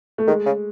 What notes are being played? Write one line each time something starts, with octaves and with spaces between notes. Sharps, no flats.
A3
D#3 G#3
C#3